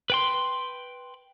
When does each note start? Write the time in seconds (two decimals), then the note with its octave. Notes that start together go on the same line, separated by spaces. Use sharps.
0.10 B4 G5 C6